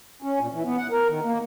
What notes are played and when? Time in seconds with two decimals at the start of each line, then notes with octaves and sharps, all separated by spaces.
0.22 C#4
0.40 A#2
0.52 E3
0.65 B3
0.77 F#5
0.91 A#4
1.08 D#3
1.24 A#3